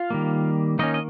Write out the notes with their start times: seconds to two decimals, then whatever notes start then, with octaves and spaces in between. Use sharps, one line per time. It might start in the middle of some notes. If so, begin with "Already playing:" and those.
Already playing: F4 F5
0.10 D#3 G3 A#3
0.79 D#3 A#3 C#4 D#4 D#5
0.94 D#5